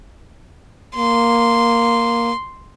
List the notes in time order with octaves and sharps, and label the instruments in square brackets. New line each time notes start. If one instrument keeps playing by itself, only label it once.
[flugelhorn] A#3 [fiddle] C6